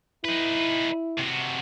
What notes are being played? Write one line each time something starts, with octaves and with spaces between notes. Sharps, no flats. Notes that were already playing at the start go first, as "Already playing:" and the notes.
D#4 E4 B4
C3 F#4